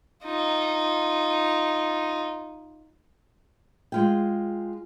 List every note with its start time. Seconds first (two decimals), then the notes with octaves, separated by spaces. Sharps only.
0.25 D#4 F4
3.92 G#3 F4 G5